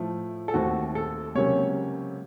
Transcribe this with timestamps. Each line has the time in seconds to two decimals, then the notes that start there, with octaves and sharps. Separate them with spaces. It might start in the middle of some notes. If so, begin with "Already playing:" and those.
Already playing: A2 F3 A3
0.48 A4
0.54 D#2 D#3 A3 C4 F#4
0.95 A4
1.35 C#2 C3 F#3 A#3 C#4 C#5